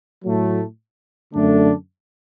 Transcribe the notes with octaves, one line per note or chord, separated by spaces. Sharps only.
A2 F#3 A3
F#2 D3 A3 D4